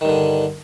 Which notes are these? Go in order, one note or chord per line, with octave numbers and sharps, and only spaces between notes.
G2 D3 D#3